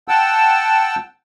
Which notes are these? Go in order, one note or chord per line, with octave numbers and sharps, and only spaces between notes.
F#5 G5 A5 E6